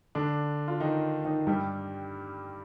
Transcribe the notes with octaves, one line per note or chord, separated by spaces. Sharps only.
D3 D4
F4
D#3 D#4
D#3 D#4
G2 G3